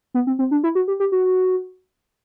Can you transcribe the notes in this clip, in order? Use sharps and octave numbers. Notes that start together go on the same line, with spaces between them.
B3
C4
C4
D4
E4
F#4
G4
G4
F#4